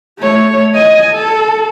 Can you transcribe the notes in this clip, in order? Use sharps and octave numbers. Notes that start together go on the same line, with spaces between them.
A3 C#5
D#5 G#5
A4